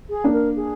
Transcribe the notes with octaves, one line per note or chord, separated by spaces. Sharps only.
G#4
A#3 D4
A#4
G#4